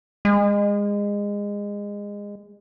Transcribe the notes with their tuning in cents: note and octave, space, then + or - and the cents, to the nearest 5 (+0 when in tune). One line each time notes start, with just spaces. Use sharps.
G#3 -25